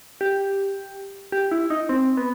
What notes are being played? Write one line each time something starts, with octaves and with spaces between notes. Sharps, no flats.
G4
G4
E4
D#4
C4
B3